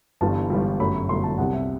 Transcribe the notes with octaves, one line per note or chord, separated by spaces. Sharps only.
G1 G2 E3 G3 A5
G1 G2 E3 G3
G1 F#2 F#3 A3 B5
G1 F#2 F#3 A3 C6
A5
C2 C3 G3 F#5
E5